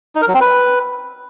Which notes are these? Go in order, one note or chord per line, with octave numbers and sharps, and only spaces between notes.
D#4
A#4
F#3
C4
B4